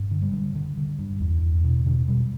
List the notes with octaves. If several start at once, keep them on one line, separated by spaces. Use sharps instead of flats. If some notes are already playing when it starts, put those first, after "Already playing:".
Already playing: G2
D3
G3
D3
D3
D3
G2
E2
E2
B2
B2 D3
B2 G3